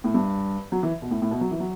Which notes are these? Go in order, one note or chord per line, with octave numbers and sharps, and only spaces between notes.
A2
G2
F#3
E3
B2
A2
A2
B2
F#3
E3
F#3